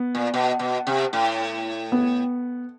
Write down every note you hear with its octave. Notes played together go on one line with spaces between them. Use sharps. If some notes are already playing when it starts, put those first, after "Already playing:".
Already playing: B3
A#2
B2
B2
C3
A2
B3